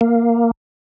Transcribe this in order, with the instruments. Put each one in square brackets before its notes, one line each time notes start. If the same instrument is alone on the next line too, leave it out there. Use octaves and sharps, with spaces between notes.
[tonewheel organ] A#3